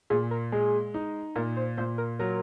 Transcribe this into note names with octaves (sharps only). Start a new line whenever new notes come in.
A#2 G#4
A#4
G#3 G#4
D#4
A#2 A#4
C5
A#2 C5
A#4
F#3 A#4